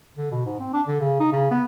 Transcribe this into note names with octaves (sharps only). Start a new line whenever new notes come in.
D3
B2
G#2
C4
D4
D3
C#3
D#4
C#3
B3